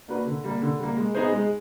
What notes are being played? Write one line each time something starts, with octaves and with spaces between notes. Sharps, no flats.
A#3 D4 F#4 B4
D3
G3 A#3
D3
G3 A#3
G#3
B3 D#4 G#4 C5
G#3